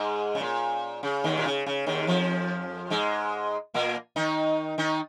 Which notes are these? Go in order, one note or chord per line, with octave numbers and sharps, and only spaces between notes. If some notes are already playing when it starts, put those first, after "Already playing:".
Already playing: G#2 G#3
C#3
A#2
C#3
D#2 D#3
A#2
C#3
C#3
D#2 D#3
F2 F3
G#2 G#3
A#2 A#3
D#3 D#4
D#3 D#4